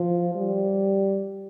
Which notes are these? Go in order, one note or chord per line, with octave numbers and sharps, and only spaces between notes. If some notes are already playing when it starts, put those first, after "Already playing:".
Already playing: F3
G3